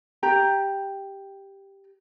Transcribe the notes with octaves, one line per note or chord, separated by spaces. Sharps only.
G4 G5 A#5